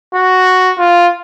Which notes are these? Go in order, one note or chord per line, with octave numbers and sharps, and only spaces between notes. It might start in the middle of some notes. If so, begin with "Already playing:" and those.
F#4
F4